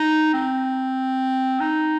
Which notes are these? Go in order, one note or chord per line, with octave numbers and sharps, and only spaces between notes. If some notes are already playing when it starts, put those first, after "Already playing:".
Already playing: D#4
C4
D#4